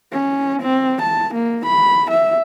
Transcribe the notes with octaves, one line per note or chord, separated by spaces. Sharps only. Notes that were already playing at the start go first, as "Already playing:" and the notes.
C#4
C4
A5
A#3
B5
E5